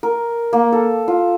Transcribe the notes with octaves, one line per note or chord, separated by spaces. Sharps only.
A#4
A#3
A4
F4